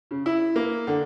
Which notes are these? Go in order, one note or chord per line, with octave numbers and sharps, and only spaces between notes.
C#3
E4
A#3
D3